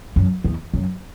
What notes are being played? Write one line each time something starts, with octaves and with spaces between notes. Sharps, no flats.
F#2
E2
F#2